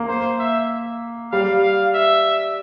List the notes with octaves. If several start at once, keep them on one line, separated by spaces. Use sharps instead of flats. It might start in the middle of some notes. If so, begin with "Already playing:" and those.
Already playing: A#3
C5
E5
G3 F5
F5
E5